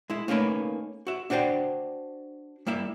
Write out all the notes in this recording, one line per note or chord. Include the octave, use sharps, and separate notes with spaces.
G#3 E4
A3 A#3 C#4 D#4 A#4 B4
F#4 E5
D4 F#4 C5 D5 G5
G3 A#3 E4 E5